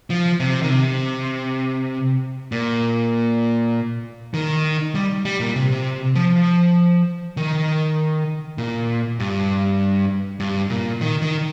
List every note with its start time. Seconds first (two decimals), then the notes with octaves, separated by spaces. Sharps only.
0.10 F3
0.40 C3
0.62 D#3
0.70 C3
2.52 A#2
4.34 D#3
4.95 G3
5.25 G3
5.40 A#2
5.56 C3
6.15 F3
7.37 D#3
8.58 A#2
9.20 G2
10.40 G2
10.70 A#2
11.01 D#3
11.22 D#3